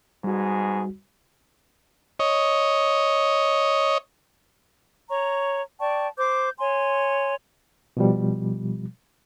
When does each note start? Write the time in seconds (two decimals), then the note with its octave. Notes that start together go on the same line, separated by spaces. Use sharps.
0.24 G#2 B2 G3 F#4 G#4
2.19 C#5 D#5
5.10 C#5 A#5 C#6
5.80 D5 G5 A5 C#6
6.17 C5 D6 G6
6.59 C#5 G#5 C6
7.97 B2 F3 G3